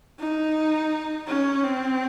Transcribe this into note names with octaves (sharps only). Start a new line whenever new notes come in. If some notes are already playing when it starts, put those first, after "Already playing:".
D#4
C#4
C4